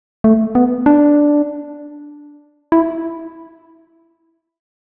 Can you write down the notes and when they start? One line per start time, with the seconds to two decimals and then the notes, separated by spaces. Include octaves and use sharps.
0.24 A3
0.55 B3
0.86 D4
2.72 E4